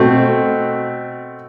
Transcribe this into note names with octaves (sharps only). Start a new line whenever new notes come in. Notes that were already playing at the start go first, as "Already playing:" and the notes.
Already playing: B2 A3 C4